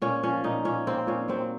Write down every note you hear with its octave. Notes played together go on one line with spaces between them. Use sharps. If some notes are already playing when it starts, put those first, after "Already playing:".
A#2 C#4
F3 C#4
A#2 D#4
A#2 C#4
A#3 C4
A#2 C#4
F#3 C4